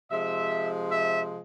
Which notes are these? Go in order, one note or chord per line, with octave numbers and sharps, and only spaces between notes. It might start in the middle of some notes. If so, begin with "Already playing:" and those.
C3 F3 G#3 E5
E5